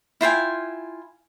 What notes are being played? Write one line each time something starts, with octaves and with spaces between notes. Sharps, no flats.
E4 F4 G5 G#5